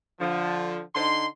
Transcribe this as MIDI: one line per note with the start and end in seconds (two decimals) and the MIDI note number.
0.20 0.80 50
0.20 0.80 53
0.95 1.26 50
0.95 1.26 63
0.95 1.26 84